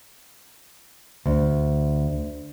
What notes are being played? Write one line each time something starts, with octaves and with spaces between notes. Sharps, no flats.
D2